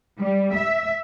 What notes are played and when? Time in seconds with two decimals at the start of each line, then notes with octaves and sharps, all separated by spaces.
0.20 G3
0.57 E5